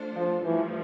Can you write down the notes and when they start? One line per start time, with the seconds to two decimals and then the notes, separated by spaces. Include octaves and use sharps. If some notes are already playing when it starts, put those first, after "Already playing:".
Already playing: A3 D4 F4 A4 C5
0.15 F3
0.43 G2 E3 F3 A3